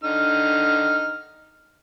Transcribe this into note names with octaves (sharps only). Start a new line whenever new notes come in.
D3 D#4 F6